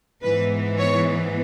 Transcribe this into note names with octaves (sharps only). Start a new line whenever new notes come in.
G#2 E3 B3 B4
C#5